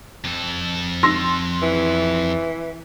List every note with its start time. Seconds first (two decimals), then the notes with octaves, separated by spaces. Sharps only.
0.24 F2 A4
1.03 C6 E6 A#6
1.62 E3